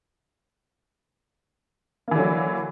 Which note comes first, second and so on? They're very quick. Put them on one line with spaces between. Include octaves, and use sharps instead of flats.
A#3 E3 D3 F#3